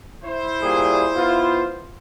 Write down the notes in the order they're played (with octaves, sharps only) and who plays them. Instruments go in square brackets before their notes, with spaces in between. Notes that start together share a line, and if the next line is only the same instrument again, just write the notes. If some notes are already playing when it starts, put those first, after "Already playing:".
[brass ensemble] E4 C5
[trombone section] A#2 G3 G#4
B3 F4